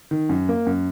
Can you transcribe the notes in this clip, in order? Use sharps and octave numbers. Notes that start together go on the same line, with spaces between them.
D#3
F#2
A#3
F#2